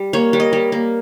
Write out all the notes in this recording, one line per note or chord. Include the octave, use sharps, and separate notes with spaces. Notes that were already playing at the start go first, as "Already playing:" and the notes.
Already playing: G3
A#3 C#5
G3
D#5
G3
A#3